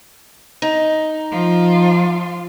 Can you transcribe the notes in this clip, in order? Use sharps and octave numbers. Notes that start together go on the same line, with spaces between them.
D#4
F3 F4